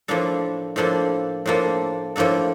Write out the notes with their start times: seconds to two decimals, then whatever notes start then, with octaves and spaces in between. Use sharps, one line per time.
0.08 A2 F3 A#3 D4 A4
0.76 A2 F3 A#3 D4 A4
1.46 A2 F3 A#3 D4 A4
2.16 A2 F3 A#3 D4 A4